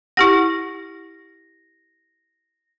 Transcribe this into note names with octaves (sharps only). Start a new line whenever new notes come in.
E4 G4 F#5 A#6